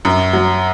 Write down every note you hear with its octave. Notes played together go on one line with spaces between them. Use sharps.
F#2
F#3